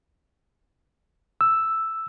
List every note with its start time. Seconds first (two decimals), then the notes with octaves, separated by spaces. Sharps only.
1.41 E6